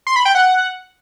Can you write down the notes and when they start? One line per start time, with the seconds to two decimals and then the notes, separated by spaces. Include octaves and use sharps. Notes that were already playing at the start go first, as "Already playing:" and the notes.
0.07 C6
0.16 B5
0.25 G5
0.35 F#5